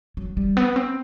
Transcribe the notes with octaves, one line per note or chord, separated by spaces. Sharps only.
F#3
G3
B3
C4